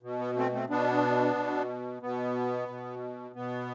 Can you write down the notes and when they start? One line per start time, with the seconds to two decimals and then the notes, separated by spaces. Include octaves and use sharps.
0.03 B2
0.19 B3
0.36 A3 C4
0.53 A3 C4
0.69 B2 B3 D4
1.35 B2
2.02 B2 B3
2.68 B2
3.35 B2 B3